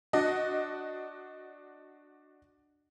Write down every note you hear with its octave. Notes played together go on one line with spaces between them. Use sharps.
D4 F#4 D#5